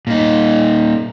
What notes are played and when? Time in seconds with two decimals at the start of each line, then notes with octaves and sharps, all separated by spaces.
0.07 A#2 D#4